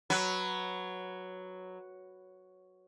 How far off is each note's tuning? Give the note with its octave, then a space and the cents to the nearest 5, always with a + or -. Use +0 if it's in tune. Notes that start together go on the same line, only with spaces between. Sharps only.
F#3 +0 B4 +0